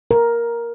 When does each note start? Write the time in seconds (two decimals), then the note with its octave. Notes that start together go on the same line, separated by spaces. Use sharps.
0.11 A#4